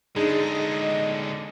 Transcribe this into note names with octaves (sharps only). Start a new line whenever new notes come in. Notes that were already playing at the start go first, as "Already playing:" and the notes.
D3 G#3 D4 D#4 G#4 D#5